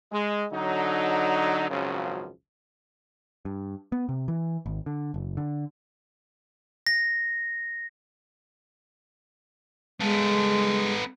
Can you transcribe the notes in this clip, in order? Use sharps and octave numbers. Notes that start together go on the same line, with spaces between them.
G#3
D3 F#3 D#4
G#1 C#2 F#2 C#3 F3 F#3
G2
B3
C3
E3
G#1
D3
F#1
D3
A#6
G#3 B3 A4